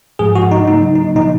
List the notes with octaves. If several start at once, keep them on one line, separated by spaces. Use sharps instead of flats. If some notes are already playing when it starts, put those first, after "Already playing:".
G#2 F3 G#3 G#4
F#4
D#4
C#3 F#3 A#3 D#4
D#4
A#2 F3 A#3 D#4